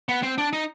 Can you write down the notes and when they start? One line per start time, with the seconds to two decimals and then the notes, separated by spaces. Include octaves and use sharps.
0.09 B3
0.23 C4
0.38 D4
0.53 D#4